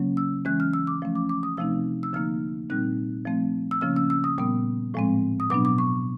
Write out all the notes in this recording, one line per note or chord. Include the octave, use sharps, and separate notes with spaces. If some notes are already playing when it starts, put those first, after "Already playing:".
Already playing: C#3 F#3 A#3 C#4
E6
E3 G#3 C#4 F#6
F6
E6
D6
F3 A3 C#4
D6
D6
D#6
C3 F3 A3 C4 D#4 E6
E6
D3 F3 A#3 D#4 F6
A#2 G3 C4 D#4 F#6
F3 A3 C4
E6
C#3 F3 A#3 C#4 F6
E6
E6
D#6
A#2 G3 B3 D#6
A2 F3 G#3 C4
D#6
B2 F#3 B3 D4 D6
D6
C#6